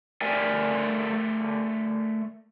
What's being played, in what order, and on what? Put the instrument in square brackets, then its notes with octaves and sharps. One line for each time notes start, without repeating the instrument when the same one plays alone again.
[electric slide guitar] A3 A#4 D5 E5 G5 G#5